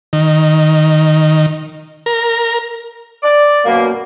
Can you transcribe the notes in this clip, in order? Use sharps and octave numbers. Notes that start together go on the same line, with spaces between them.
D#3
A#4
D5
F#2 B2 A#3